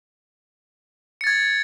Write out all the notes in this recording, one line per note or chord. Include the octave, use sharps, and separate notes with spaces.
G#6 A6 C#7